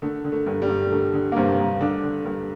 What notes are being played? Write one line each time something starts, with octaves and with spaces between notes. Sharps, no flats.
D3 A3
D3
A3
G2
G3
G2
D3 A3
D3
A#3
G2 C3 C4
G2
D3 D4
D3
G2